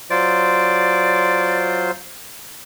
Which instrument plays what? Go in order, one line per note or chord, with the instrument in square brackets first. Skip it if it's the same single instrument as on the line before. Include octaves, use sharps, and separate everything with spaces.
[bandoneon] F#3 F4 C5 [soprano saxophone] D5